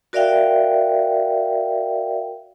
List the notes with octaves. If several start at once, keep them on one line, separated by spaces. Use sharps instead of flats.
F#4 A#4 D5 E5 F5 G5